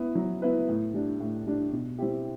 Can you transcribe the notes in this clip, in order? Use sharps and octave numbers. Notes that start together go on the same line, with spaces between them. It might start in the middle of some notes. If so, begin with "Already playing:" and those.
Already playing: B3 E4 B4
F#3
B3 E4 B4
A2
G3 D4
A2
G3 D4
B2
G3 C4 E4 G4